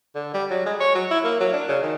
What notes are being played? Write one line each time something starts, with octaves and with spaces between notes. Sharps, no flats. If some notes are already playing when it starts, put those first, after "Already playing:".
D3
G3
F#3
G#3
C#5
F#3
E4
A#3
F#3
D4
C#3
D#3